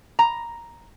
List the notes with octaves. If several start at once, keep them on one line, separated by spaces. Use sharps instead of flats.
A#5